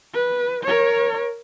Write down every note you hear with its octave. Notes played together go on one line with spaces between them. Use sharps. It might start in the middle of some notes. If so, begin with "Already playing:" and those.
B4
A#4 C#5